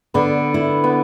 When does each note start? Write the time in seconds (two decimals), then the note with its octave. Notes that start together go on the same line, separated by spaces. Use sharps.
0.14 D3 B3
0.54 E4
0.84 B3